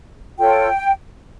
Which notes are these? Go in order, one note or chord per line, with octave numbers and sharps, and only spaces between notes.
F4 A4 C#5 G5